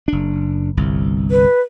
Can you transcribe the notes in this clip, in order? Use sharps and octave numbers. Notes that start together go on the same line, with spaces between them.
F#1 D4
G1 C2
B4